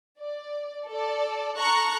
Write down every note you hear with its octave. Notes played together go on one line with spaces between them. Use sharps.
D5
A4 D5
A4 A#5 C#6 F#6 C#7